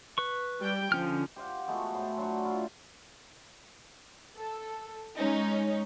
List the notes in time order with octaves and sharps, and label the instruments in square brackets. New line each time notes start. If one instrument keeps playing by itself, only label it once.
[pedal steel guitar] B4 C#6
[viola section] G3 G5
[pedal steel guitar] D3 C#4 F6 [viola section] F3
[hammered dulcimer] G4 C5 F5 F#5
G#3 A3 B3 F#4
A2 C5 A5 C6
F#3 D4 C5 C#6
E4 F4
[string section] A4
G#3 C#4 D#4